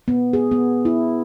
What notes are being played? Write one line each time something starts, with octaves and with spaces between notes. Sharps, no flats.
B3
G#4
B3
E4